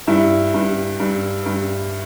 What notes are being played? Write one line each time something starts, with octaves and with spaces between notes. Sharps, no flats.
G2 E4
G2
G2
G2